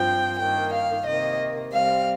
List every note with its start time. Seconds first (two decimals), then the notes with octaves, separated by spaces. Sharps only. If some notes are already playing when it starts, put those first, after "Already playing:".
Already playing: G2 F3 C4 G5
0.39 G2 D#3 A#3 G5
0.72 F5
1.05 C3 D#3 A#3 D#5
1.72 C3 G3 C4 F5